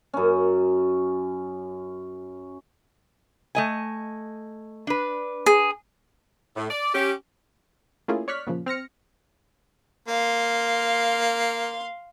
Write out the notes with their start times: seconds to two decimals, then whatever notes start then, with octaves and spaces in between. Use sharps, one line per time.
0.13 F#2 C#4
3.55 A3 D#5 G#5
4.87 D4 B4
5.46 G#4
6.56 A2
6.70 D5
6.94 C#4 G4
8.08 A3 A#3 C#4 E4 F4 G#4
8.28 C#5 D5 C#6 F6 F#6 B6
8.47 A#2 C#3 F3
8.66 C4 F6 A#6 C#7
10.08 A#3 F5 C6